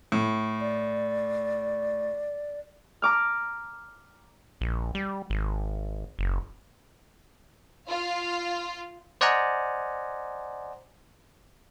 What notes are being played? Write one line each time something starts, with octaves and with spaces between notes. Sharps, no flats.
A2
D5
A#5 D6 F6
A#1
G3
G#1
F#1
F4 F5
C5 D5 D#5 F#5 G#5 A#5